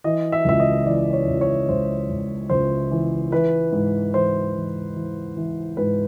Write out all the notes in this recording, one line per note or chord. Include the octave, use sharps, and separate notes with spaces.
E3 D#5
E5
C#2 E5
D#5
E3 D5
C#5
C#2
C#5
C#2 C5
C#2
C#2 C5
E3
E3 B4
G#2
E3 C5
E3
E3
E3
G#2 B4